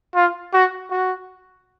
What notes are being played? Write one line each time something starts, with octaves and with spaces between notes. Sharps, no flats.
F4
F#4
F#4